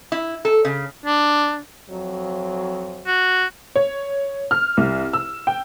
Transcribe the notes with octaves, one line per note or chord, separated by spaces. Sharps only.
E4
A4
C#3
D4
F2 F#3
F#4
C#5
F6
C2
E6
G5